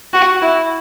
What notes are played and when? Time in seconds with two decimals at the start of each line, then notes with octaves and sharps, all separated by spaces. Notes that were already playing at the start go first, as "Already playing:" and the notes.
0.13 F#4
0.42 E4